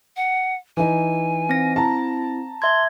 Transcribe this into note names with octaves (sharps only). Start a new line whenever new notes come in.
F#5
E3 D#4 G#5
C4 A#6
E4 A5 A#5
E5 C6 G#6